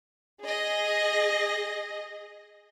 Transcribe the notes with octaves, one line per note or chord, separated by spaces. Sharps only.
G#4 D#5